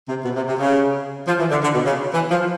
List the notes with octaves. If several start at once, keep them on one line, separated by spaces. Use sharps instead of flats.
C3
B2
C3
C3
C#3
F3
E3
D3
D3
B2
C#3
E3
F3